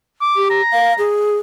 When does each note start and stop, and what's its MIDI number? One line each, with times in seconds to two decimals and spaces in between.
0.21 0.49 86
0.36 0.62 67
0.50 1.09 82
0.72 0.93 77
0.98 1.36 68